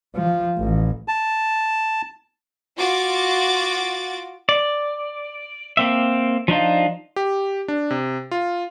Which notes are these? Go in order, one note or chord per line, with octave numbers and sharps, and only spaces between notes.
F3
A1
A5
F4 F#4 D6 A6
D5
A#3 C4 E5
F3 D4 D#4 F4
G4
D4
C3
F4